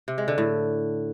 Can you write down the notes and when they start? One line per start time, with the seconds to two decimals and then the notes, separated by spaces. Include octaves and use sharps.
0.08 C3
0.18 G#3
0.28 D3
0.38 A2